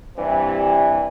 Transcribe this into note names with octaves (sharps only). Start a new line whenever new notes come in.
G2 C3 E3